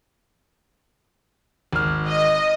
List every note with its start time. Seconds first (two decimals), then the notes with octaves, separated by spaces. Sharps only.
1.73 G#1 F6
2.06 D#5